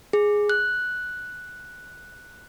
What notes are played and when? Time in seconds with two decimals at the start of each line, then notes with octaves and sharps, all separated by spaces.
0.13 G#4
0.50 F#6